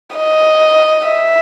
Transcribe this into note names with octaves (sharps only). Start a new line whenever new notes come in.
D#5
E5